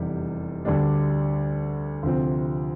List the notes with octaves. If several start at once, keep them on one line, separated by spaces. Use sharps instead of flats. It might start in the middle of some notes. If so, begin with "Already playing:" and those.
Already playing: F1 E2 C3 G3
D2 D3 G3 D4
D2 C3 F3 C4